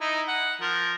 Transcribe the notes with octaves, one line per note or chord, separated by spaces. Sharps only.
D#4 E4
F#5
F3 A#4